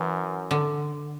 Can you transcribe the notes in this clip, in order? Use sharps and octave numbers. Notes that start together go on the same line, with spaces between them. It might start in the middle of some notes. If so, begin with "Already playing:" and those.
Already playing: F#2 E3
D3